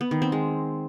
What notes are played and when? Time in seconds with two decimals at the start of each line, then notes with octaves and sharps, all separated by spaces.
0.01 B3
0.11 D#3
0.22 C4
0.32 G#3